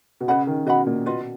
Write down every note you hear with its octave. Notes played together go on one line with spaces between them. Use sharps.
B2
C#3 B4 D#5 F#5 B5
D#3
B2 B4 D#5 F#5 B5
A#2
B2 F4 B4 D#5